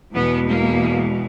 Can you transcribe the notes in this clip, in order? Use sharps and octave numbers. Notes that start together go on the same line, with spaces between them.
E2 B2 G#3 B3
A#3